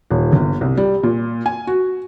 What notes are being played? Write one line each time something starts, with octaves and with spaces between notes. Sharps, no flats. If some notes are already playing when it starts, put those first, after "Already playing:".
D#1
G1
C2
G3
A#2
G#5
F#4